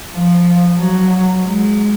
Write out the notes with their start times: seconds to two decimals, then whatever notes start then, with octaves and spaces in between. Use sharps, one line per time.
0.14 F3
0.78 F#3
1.44 G#3